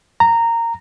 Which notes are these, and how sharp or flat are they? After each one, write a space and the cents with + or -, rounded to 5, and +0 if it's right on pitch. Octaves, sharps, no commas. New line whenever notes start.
A#5 -15